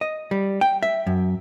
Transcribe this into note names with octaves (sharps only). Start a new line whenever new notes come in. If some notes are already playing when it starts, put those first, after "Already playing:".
D#5
G3
G5
E5
F#2